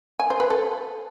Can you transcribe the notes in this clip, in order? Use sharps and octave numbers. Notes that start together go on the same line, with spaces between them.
G#5
C5
B4
A4